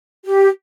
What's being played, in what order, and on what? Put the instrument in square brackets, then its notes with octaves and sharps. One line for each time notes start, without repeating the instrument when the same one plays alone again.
[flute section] G4